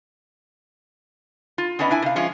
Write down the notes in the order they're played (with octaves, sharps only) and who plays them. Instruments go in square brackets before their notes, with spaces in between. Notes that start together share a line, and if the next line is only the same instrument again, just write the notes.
[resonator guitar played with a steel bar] F4
B3 C#4 D4 B4 D#5
D4 E4 G#5
C3 F5
F3 G#3 C#4 F4